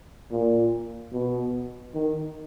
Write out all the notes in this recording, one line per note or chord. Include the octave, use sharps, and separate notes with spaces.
A#2
B2
D#3